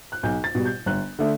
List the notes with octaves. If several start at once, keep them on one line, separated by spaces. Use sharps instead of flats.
F#6
B1 G6
A6
B2 G3
G6
G1 F#6
D3 A3